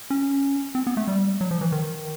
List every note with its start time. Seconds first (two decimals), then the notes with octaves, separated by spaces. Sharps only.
0.10 C#4
0.75 C4
0.87 B3
0.97 A3
1.08 G3
1.41 F#3
1.51 F3
1.61 E3
1.72 D#3